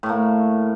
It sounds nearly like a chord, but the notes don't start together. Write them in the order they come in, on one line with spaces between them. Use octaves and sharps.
A2 A3 A#3